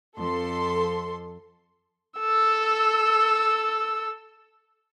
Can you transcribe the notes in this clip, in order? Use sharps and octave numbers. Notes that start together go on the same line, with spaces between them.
F2 A4 C6
A4 E6